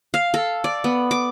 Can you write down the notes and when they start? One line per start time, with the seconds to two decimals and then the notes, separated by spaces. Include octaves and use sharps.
0.14 F5
0.34 A4
0.64 D5
0.84 B3
1.11 D6